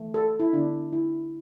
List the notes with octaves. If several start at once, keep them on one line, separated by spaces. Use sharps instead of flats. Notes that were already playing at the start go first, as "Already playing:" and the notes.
Already playing: E3 A3
A4
E4
D3 B3 D4
E4